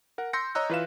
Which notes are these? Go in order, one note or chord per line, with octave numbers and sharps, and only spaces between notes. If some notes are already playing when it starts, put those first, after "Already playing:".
A#4 F#5
C6 E6 G6 A#6 C#7
C#5 D#5 A#5 E6 F#6
E3 F4 B4 E5 F5 E7